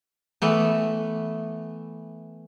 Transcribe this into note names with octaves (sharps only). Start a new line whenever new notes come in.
E3 A3 B3